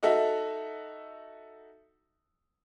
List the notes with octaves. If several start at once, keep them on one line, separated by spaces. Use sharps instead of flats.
D#4 F#4 A4 E5